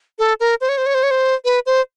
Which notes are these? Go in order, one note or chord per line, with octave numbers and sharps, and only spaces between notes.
A4
A#4
C5
C#5
C5
C#5
C5
C#5
C5
B4
C5